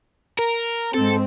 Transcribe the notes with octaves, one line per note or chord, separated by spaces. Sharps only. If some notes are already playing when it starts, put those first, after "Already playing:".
A#4
G#2 C4 A4